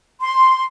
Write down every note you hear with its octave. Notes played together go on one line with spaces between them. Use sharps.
C6